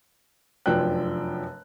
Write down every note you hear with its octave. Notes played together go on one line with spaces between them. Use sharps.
F1 F#2 F3 D4 G5 F#6